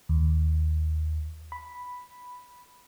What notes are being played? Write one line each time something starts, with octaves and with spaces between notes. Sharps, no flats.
D#2
B5